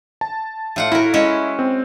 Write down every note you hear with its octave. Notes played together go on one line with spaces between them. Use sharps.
A5
A2 F4 F#5
E4 F#4 A#4
G#3 C#4 F#4
C4